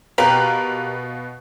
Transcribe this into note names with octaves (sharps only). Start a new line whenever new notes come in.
B2 G4 A#4 B4 F5